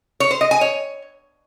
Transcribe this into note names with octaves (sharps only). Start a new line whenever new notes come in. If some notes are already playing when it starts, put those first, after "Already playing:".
C#5
C5
D#5
G#5
C#5